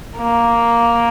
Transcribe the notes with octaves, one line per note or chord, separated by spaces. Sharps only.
A#3